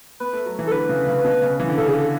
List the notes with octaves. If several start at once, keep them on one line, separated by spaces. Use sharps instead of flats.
B3 B4
A3
F#3
E3
A4
D3 B4
C#3
C#3
B2
C#3
E3
D3
C#3 A4
D3 G#4
A4